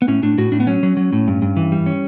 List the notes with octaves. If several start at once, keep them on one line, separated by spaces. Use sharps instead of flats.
B3
A2 C#4
A2 D4
A2 F#4
A2 D4
B3
F#3 C#4
F#3
F#3
A2
G2
G2
E3
G3
C#4